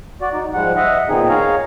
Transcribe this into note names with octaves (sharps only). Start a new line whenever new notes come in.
F#4 D5
D#4
G#2 F3 G3 G#3 F#5
D#5 E5 F#5
A#2 D#3 B3 C4 D#4 G#4
G#4 C#5 F5 A#5